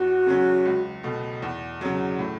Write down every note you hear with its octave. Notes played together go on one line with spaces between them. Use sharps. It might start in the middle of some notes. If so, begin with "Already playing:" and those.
Already playing: E2 F#4
C#3 F#3 C#4
C#2
B2 A3
E2
C#3 F#3
A2